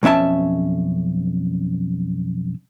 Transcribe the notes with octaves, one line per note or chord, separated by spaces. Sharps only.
B1 F2 C#4 E5 A5